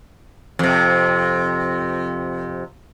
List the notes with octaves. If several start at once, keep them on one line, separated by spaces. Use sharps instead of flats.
F2 C3